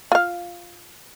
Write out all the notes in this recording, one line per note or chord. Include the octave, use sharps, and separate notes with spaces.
F4 F5